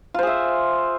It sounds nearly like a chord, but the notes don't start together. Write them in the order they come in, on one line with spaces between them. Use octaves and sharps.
F4 C5 G#4 E5